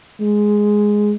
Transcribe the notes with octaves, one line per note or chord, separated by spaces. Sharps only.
G#3